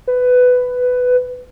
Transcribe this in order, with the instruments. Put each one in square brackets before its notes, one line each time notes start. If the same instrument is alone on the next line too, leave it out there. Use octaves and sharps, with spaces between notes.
[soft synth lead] B4